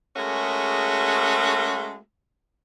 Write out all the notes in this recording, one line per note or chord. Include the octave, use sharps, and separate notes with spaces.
G#3 A3 C#4 F#4 G#4 A#4